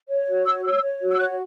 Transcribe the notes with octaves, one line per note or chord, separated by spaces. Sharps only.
C#5
F#4
C#5 E6
C#5 E6
C#5
F#4
E6
C#5 F#6